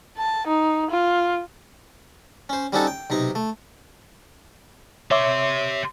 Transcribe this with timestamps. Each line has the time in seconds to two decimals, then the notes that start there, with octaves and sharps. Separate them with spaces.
0.18 A5
0.47 D#4
0.91 F4
2.49 C#4 C5
2.73 G3 C4 C#4 D#4 F#4 A4
2.87 G5
3.10 B1 C3 D#4 A#5
3.35 A3
5.11 G4 C#5 E5 C6 D6